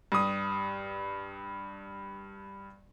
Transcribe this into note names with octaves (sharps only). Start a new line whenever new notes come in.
G2 D#6